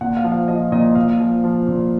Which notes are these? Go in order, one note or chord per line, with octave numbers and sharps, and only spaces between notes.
A#2 F#5
F5
F3
F5
F3 D#5
A#2 D#5
A#2 F5
F3
F3
A#2